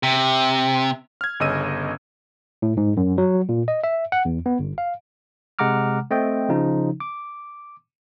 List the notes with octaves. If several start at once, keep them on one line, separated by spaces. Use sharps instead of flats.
C3
F6 G#6
G1 C#3 C#4 D#5 E6 D#7
A2
G#2
F#2
F#3
A#2
D#5
E5
F#5
E2
B3
G1
F5
C3 G#3 F#5 A#5 D6 F6
A3 C4 D#5 G5
C#3 F3 D#4
D6